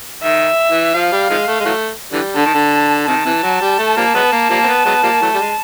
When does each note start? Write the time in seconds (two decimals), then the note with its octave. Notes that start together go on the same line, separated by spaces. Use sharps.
0.23 D#3 E5
0.70 E3
0.94 F3 F5
1.12 G3
1.30 D#3 F3 G#3
1.47 A3
1.60 G#3
1.65 E3 F#3 A3
2.12 D3 E3 G3
2.36 D3 A5
2.46 D#3
2.54 D3
3.08 C3 D#3 A5
3.25 C3 E3
3.43 F#3
3.61 G3
3.79 A3
3.97 F3 G3 A#3
4.14 F#3 G#3 B3
4.32 A#3
4.50 F3 G3 A#3
4.64 C4
4.67 B3
4.85 F#3 G#3 B3
5.03 F3 G3 A#3
5.21 E3 F#3 A3
5.34 G3
5.39 G#3